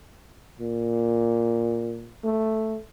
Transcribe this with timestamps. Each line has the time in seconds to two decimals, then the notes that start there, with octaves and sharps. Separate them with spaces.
0.59 A#2
2.24 A3